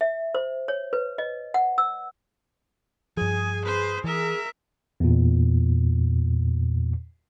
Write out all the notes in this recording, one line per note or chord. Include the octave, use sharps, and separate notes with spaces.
E5
C5
C#5
B4
D#5
F#5
E6
G2 F3 G#4 G#5
B4 C5
E3 A#4 E5
E2 A#2